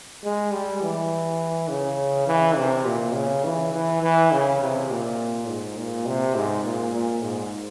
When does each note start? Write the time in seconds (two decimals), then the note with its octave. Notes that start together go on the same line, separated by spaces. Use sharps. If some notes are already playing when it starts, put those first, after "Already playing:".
0.24 G#3
0.53 G3
0.82 E3
1.69 C#3
2.27 E3
2.57 C3
2.85 A#2
3.15 C#3
3.44 E3
3.73 E3
4.02 E3
4.32 C#3
4.61 C3
4.90 A#2
5.48 G#2
5.77 A#2
6.06 C3
6.36 G#2
6.65 A#2
6.94 A#2
7.23 G#2